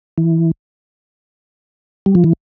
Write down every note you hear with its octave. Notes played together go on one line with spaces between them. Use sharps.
E3
G3
F3
E3